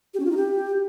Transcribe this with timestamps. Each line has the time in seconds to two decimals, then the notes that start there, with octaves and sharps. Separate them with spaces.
0.14 G4
0.20 C#4
0.25 F4
0.31 D#4
0.37 G4